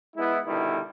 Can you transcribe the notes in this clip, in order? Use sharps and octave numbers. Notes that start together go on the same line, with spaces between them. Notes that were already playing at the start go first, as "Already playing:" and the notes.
G#3 B3 E4
B2 D3 D#3 G3 E4